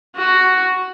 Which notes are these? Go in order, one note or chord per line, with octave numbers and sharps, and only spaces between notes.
F#4